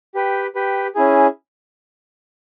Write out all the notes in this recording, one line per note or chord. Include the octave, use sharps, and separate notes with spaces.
G4 B4 G5
G4 B4 G5
C#4 E4 G#4